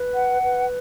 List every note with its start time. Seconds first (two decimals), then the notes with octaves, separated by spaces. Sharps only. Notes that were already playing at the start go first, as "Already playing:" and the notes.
Already playing: B4
0.14 F#5
0.42 B4